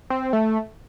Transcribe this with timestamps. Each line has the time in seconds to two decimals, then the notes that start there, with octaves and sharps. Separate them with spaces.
0.10 C4
0.33 A3